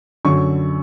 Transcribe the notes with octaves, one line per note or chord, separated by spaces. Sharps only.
F#2 D3 F#3 C#6